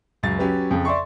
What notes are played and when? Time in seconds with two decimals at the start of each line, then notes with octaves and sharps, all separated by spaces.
0.23 C#2 F#2 A6
0.39 F#3 C#4 G4 B4
0.71 F2 C#3
0.85 D5 E5 C6 C#6